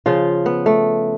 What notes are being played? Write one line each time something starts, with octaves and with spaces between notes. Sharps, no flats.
C#3 F3 F4
B3
A3